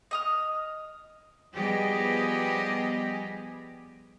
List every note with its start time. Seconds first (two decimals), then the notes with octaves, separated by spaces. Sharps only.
0.11 D#5 D#6 F6
1.56 F3 G3 B3 G4 G#4 D#5